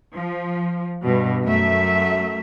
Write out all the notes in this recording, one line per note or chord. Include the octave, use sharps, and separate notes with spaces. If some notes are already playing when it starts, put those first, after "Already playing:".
F3
G2 B2
F#2 A3 E5